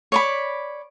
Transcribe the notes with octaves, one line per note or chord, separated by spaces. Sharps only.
C#5 D5 B5